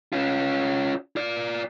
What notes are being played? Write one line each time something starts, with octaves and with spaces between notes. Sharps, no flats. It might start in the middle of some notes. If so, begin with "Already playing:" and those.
C#4 F4
F4 D5